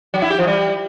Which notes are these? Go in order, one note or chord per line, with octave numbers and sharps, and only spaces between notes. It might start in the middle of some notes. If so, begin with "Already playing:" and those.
F#3
E4
G4
F3
G3